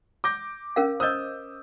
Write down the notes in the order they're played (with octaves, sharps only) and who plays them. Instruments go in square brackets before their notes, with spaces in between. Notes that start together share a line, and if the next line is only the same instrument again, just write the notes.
[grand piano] D6 G6 A#6
[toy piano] C#4 A#4 F5
[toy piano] C5 D#5 [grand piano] D#6 E6 G6